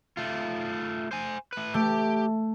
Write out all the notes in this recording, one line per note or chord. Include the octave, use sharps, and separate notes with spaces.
A3 F4
C5 G#5
A3 B4
A3 G4